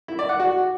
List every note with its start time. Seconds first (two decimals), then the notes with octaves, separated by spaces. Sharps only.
0.08 E4
0.19 D5
0.29 F#5
0.40 F#4